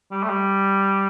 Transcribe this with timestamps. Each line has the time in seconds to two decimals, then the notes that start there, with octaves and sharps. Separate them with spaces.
0.11 G3
0.23 A3
0.29 G3